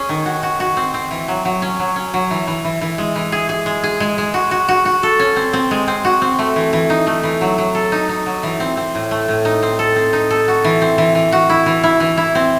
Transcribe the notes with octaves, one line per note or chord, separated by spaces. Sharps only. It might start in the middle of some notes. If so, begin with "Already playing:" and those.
Already playing: C#4 G#4
D#3
F#4
F#4
F#4
C4
C4
E3
F#3
F#3
C#4
F#3
C#4
F#3
E3
E3
E3
E3
G#3
E3
G#4
G#4
G#3
G#4
G#3
G#3
F#4
F#4
F#4
F#4
A4
C#4
C4
C4
G#3
C4
F#4
C4
A3
E3
E3
D#4
A3
E3
F#3
F#3
A4
D#4
D#4
F#3
E3
C4
C4
A2
A3
A2
D#4
C4
A4
C4
D#4
A4
F#4
E3
C4
E3
E3
F#4
E4
E3
E4
E3
E4
C4